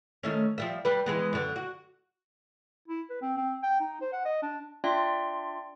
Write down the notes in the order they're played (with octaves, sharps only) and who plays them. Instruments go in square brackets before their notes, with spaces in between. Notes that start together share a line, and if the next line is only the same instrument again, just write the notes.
[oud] D#3 A3 C#4
F3 G3 E5
G3 G4 B4
E3 G#3 B3
F#2 D3
F#4
[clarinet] E4
B4
C4
C4
G5
D#4
C5
F#5
D#5
D4
[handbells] D4 F4 D5 E5 G5 C6